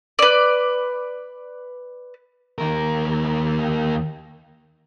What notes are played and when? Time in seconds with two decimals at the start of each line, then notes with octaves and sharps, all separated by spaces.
0.19 B4 D5
2.58 D#2 A#4